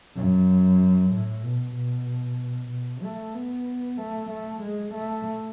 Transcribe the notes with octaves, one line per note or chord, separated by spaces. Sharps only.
F#2
A2
B2
B2
B2
A3
B3
A3
A3
G#3
A3